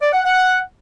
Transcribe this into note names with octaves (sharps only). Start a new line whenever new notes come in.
D5
F#5
F#5